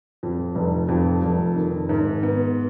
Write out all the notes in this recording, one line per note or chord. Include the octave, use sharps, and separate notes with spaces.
F2
F1
F2
F1
D#3
G#2
B3